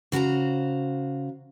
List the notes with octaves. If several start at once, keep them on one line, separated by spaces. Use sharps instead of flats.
C#3 F#4 C5 G#5 A#5